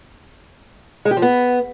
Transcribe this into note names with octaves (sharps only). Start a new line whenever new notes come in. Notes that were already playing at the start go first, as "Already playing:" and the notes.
G#3
G4
F3
B3